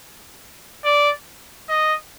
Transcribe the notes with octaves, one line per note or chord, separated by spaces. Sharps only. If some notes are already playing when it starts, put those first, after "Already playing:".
D5
D#5